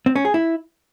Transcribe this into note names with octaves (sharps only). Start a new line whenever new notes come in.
C4
C#4
G#4
E4